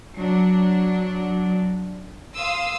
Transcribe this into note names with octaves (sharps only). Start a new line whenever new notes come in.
F#3 D4
F5 C6 D#6 E6